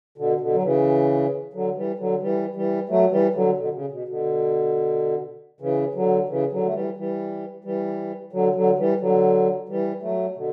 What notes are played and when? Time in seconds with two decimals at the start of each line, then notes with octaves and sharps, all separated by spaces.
0.18 B2 D3
0.40 B2 D3
0.53 F#3
0.63 C#3 E3
1.53 D3 F#3
1.76 E3 G3
1.99 D3 F#3
2.21 E3 G3
2.55 E3 G3
2.89 F#3 A3
3.12 E3 G3
3.34 D3 F#3
3.58 B2 D3
3.74 C#3
3.92 B2
4.08 B2 D3
5.60 C#3 E3
5.95 D3 F#3
6.29 C#3 E3
6.52 D3 F#3
6.65 A3
6.74 E3 G3
6.97 E3 G3
7.64 E3 G3
8.32 D3 F#3
8.55 D3 F#3
8.78 E3 G3
9.00 D3 F#3
9.69 E3 G3
10.02 F#3 A3
10.36 B2 D3